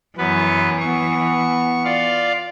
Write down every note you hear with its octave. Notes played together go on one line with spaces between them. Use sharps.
F#2 E3 B3 B4
B3 C#6
F4 D5 F5